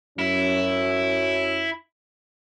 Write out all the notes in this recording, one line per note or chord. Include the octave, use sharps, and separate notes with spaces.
F#2 C#4 E4